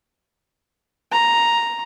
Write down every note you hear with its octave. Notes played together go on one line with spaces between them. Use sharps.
A#5